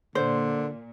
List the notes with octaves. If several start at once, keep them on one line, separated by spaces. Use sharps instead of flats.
A#2 D3 C5